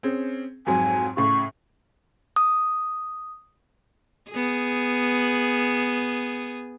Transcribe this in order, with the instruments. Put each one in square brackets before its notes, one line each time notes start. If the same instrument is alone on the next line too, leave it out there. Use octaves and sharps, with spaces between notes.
[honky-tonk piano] C4 C#4 G#4
[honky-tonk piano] F2 G#2 F#3 [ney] G#5
[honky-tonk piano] A2 C#3 [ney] C#6
[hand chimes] D#6
[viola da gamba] B3 G#4